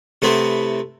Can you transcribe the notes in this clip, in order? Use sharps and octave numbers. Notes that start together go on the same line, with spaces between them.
C3 A3 B3 C4 E4